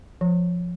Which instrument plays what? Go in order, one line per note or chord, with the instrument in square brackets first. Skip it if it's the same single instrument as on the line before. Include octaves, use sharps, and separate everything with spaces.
[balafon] F3